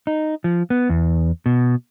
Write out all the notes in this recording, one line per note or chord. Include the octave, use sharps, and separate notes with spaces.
D#4
F3
B3
E2
B2